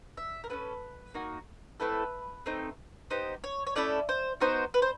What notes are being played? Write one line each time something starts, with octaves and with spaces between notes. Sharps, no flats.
E5
A#4
C#4 E4 A4 B4
A#3 D#4 F#4
A3 C4 E4 A4 B4
A3 C4 D#4
B3 D#4 G4 C5
C#5
C#5
A3 C#4 E4 A4 D5
C5
B3 D#4 F#4 C5
B4
C5